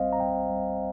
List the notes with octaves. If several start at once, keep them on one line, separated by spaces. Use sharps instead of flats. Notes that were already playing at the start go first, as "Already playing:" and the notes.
Already playing: A#1 G3 C4 C5 D#5 F5
A#5
G3 G5
G3